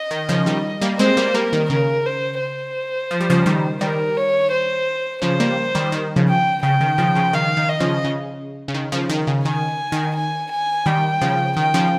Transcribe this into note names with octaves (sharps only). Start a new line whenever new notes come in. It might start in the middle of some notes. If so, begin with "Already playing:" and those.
Already playing: D#5
D#3
C#3 F3
D#3 G3
G3 A#3
G#3 C4 C5
G3 A#3
G3 A#3 A#4
D#3
C#3 A#4
C5
C5
F3
G3
C#3 F3
D#3 G3
D#3 G3 A#4
C#5
C5
C#3 F3 C5
G3 A#3
D#3 G3
D#3
C#3 F3
G5
C#3 G5
D#3
C#3 F3
C#3 F3
D#3 F5
D#3
D#5
C#3 F3
C#3
C#3
D#3
C#3 F3
D#3
C#3
D#3 G#5
D#3
G#5
G#5
D#3 G3 G5
C#3 F3
D#3 G5
C#3 F3